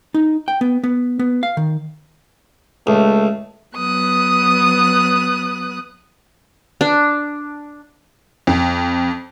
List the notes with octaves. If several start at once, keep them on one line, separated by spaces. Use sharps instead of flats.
D#4
G5
B3
B3
B3
F5
D#3
C#2 A3
F#3 B3 D#6 F#6
D4
F2